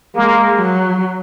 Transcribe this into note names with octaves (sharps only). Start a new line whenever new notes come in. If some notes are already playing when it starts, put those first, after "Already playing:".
G#3 A#3
F#3